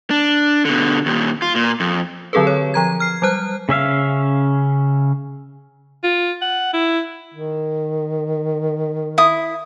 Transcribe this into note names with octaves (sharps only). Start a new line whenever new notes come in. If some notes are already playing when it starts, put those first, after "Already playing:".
D4
B2 D3
D#2 A#2
F4
A#2
F2
D3 F#3 C4 G#4 A4 B4
C#5
F3 A#5 G#6
F6 C7
F#3 G3 C5 F#6
C#3 C#4 E5 F5
F4
F#5
E4
D#3
E4 D#6